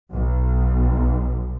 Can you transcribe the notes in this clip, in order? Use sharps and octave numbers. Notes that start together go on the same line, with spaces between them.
B1